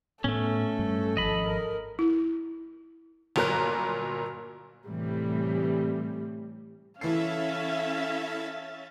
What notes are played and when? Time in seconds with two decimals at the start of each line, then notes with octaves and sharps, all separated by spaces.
0.24 A2 A3 B3 C#4 A4
0.79 G2 G3
1.17 G#1 C#2 F3 D#5 B5
1.47 A#4
1.99 E4
3.36 G1 A#2 F#3 A#4 A#5 F#6
4.87 A2 C3 E3 G3
7.01 E3 C#4 E4 A4 E5 F5 A6 C7